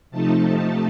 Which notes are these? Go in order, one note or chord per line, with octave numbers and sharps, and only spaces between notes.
C3 F3 A3 D#4 A5